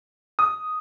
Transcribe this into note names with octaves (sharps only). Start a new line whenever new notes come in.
D#6